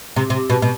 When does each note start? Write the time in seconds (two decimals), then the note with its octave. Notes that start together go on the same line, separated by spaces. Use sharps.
0.16 C3
0.30 C3
0.50 B2
0.62 B2